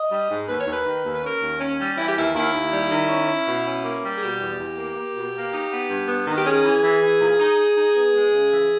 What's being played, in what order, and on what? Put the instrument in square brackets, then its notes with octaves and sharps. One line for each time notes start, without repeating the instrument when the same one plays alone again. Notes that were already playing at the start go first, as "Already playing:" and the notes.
Already playing: [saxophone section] D#5
G3
G#2
D#2 B4
C#5
D#2
B4
D#3
D#2
B4
C#4 A#4
D#2
C#4
G3
E3 E4
G4
D#2 E4
D#2 E4
D#2
G3
D#3
C#4
C#4
B2
C#4
A#3
G3
G#4
B2 G4
E2
E2
A#3
A#3
B2
A#3
D#4
B3
G2
B3
D#3
G4
C#4 G#4
E3
E3
E3
A#2
D#4
D#4
D#4
B3
G#3
C#3
E3